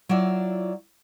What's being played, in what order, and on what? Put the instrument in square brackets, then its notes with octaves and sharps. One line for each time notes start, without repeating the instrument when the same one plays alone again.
[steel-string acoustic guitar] F#3 E4 F4 D5